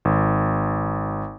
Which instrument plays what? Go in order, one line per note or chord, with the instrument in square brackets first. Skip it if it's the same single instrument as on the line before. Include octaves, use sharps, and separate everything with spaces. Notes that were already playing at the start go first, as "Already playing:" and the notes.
[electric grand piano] G#1